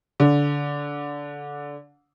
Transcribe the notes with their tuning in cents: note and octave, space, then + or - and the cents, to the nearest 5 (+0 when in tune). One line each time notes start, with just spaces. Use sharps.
D3 -20